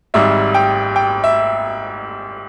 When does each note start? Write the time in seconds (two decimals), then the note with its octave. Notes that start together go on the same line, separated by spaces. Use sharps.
0.14 G#1 G#2 G3 E5
0.54 G5
0.96 G5
1.24 E5